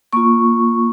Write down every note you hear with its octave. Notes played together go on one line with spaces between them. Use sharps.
A#3 F4 C#6